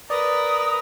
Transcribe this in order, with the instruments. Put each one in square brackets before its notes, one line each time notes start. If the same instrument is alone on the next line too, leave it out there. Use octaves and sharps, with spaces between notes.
[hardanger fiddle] A#4 B4 [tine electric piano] D5 [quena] D#6